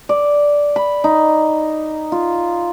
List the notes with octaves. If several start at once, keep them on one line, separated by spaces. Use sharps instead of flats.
D5
B5
D#4
F4